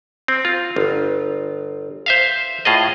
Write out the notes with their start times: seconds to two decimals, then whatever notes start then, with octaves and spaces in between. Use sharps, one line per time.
0.28 C4
0.45 F4
0.76 G1
2.06 C5 E5 F5
2.65 A2 F4 G#4 D#5